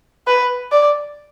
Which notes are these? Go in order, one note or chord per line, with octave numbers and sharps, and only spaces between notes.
B4
D5